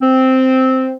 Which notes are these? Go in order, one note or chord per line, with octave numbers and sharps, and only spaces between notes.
C4